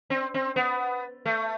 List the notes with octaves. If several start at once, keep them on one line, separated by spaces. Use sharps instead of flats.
C4
C4
B3
A3